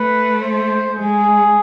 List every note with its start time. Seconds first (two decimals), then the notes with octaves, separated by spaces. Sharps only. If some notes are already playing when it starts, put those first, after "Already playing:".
Already playing: A3 B4
0.42 C5
0.96 G#3 G#4